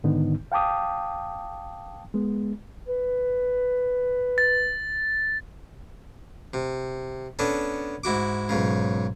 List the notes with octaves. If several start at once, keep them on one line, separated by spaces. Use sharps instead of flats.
G#2 D3 D#3 B3 D#4
F5 G5 A5 D6 D#6
G#3 B3
B4
A6
C3
B3 C#4 D4 A4
G#2 E4 F#4 D6
B1 G#2 C#3